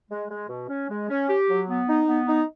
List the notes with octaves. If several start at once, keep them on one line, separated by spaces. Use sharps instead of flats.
G#3
G#3
B2
C#4
G#3
C#4
G4
F#3
B3
D#4
B3
D#4